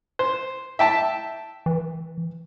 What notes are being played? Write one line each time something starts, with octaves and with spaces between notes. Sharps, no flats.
C5
E5 G5 A5
E3